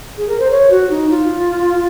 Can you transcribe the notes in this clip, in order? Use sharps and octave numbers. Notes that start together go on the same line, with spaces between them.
G#4
A#4
C5
C#5
F#4
D#4
F4